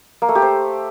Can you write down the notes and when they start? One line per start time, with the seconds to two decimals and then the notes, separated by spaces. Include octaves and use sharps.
0.22 A#3
0.29 A3
0.35 G4
0.42 C5